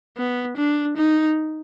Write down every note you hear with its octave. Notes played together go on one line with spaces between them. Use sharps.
B3
D4
D#4